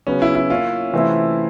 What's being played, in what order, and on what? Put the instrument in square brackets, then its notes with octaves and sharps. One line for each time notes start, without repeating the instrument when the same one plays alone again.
[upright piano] C#3 F#3 B3 [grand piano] C#4
[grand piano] E4
E4
[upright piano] A#3 C#4 E4 [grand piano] F4
[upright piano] C3 E3 A3 C4 E4